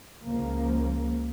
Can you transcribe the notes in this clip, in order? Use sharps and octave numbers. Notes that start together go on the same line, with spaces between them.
C#2 F3 A#3